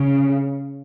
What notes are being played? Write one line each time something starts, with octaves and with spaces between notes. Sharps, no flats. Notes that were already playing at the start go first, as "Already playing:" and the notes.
Already playing: C#3